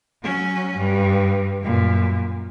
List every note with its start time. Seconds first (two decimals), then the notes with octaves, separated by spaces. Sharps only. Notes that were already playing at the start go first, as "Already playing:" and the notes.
0.23 F#3 C#4
0.76 G2
1.62 F#2 A#2